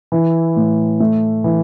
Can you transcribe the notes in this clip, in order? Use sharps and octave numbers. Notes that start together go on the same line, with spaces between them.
E3
A2
A3
E3